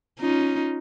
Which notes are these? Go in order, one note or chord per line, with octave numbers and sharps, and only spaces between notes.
C#4 D#4 F4